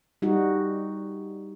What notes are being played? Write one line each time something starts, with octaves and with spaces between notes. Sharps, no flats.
G3 D#4 F#4